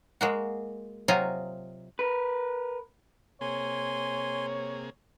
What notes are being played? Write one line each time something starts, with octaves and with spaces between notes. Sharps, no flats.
G#3 A#3 F#4
C3 F#3 F4 D#5 G#5 A#5
A#4 B4
C3 A#3 G#4 C#5 G#5 C6